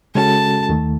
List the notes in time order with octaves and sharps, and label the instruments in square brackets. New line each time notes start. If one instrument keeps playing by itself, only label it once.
[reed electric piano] C#3 G#3 C#4 F#4 A4 [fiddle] A5
[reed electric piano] D#2 D#3 A3